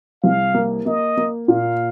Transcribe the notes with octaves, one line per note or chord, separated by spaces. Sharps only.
C2 F5
A#3
A#3 D#5
A#3
A#2 F5